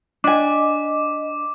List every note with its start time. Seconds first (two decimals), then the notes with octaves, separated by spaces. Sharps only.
0.24 D4 D#5 G#5 D6